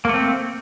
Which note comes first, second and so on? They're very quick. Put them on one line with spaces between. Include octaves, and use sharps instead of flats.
A#3 A3 C4